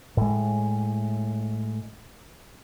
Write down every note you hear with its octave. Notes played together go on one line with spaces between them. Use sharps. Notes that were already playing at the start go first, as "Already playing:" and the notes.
A2 G#3